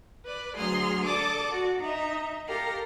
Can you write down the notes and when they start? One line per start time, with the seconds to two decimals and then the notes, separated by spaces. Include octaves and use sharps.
0.24 B4 D5
0.57 D2 F#3 G#4 C6 F6
1.04 A4 D5 A5 D6 D#6
1.51 F#4
1.80 D#4 E5
2.48 G4 A4 A#4 F5 A#5